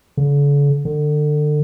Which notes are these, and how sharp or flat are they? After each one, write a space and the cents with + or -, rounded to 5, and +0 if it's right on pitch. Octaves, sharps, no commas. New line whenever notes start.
D3 -45
D3 +30